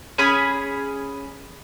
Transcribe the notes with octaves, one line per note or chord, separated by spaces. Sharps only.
C#4 G#4 B5